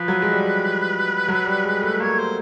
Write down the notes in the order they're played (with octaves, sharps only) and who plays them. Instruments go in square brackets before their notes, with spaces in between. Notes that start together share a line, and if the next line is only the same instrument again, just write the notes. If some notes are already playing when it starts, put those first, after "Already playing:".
Already playing: [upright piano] F3 [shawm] B4
[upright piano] F#3
G#3
G3
F#3
G3
G#3
A3
[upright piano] A#3 [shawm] C#5
[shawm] C5